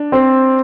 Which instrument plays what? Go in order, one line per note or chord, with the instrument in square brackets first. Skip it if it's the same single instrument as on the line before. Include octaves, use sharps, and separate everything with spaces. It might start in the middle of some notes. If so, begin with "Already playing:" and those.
Already playing: [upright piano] D4
[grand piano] C4